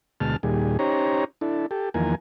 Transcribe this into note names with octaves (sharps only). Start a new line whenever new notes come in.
D2 B2 G#3 A5 F6
D#2 A#2 G3 G#4
C#4 D#4 G4 C5 C#5 A#5
D4 E4 A4
G4 A4
E2 D#3 F3 A#3 A#4 G#5